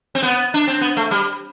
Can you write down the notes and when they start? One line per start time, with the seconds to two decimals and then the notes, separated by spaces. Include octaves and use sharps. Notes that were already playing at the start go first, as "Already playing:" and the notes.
0.15 C4
0.23 B3
0.54 D4
0.67 C4
0.81 B3
0.97 A3
1.11 G3